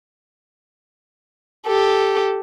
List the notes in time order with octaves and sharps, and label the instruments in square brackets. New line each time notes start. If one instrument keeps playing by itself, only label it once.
[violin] G4 A4